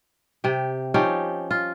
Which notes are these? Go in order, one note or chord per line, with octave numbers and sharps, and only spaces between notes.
C3 G4
F3 C#4 D#4 G4
F4